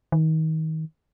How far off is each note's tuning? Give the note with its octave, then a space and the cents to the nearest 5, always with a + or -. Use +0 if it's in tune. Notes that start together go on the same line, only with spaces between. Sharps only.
D#3 +30